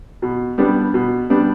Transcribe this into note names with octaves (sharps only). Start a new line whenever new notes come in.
B2
G3 B3 D4
B2
G3 B3 D4